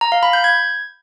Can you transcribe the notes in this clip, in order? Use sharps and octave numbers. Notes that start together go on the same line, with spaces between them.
A#5
F5
B5
G6
G#6